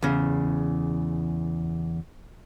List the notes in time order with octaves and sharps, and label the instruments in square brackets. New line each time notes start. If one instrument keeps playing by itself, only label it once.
[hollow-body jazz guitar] E2 C#3